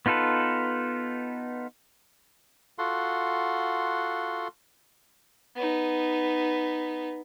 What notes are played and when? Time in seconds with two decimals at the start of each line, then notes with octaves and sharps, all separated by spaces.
0.06 B3 D#4 F4 A4 B4
2.79 F4 F#4 A4 F#5 C6
5.56 B3 D#4